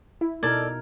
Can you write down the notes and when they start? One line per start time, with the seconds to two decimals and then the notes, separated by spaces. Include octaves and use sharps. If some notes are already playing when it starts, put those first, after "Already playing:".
0.21 E4
0.43 B2 D#4 A4 A#4 D5 G#6